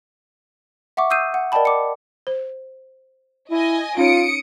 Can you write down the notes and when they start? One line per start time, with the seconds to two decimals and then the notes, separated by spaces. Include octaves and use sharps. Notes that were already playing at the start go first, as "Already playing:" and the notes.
0.97 E5 F#5 C#6 D6
1.10 D#6 E6 G6 C7 D#7
1.34 F#5
1.52 A#4 D5 D#5 G5 A5 B5
1.65 D6 C#7
2.27 C5
3.51 E4 D#5 G#5
3.97 C#4 D#4 F4 C#5 D#6 C#7 D7